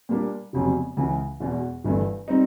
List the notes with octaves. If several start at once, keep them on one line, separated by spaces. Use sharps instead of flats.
A#2 G3 A#3 D4
F1 F2 C#3 F#3 B3
C#2 C#3 E3
E1 E2 B2
G1 G2 E3 A3
G3 C4 D#4